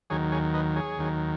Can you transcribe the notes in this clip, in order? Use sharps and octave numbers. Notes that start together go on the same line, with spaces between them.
D#2 D#3 F#3 G#4 C#5
G#4 C#5
B4 D#5
G#4 C#5
D#2 D#3 F#3